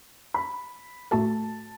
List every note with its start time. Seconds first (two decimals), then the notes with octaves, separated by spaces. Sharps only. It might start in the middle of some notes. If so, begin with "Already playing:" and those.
0.34 B5
1.11 A2 A3 F#4 A4 A5